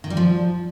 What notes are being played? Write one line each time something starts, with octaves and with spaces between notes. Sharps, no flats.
D#3
G3
F3